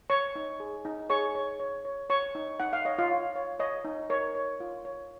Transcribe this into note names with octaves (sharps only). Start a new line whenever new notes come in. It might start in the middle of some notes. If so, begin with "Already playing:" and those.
C#5 C#6
D#4
G#4
D#4
G#4 C#5 C#6
C#5
C#5
C#5
C#5 C#6
D#4
D#4 F#5
F5
C#5 D#5
F4 F5
C#5
C#5
C#5 D#5
D#4
A#4 C#5
C#5
F4
C#5